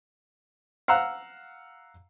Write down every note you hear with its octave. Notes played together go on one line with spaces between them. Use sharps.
F5 F#5 A#5 E6 F#6